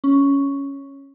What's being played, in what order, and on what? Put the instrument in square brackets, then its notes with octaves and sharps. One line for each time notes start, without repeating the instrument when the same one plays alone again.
[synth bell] C#4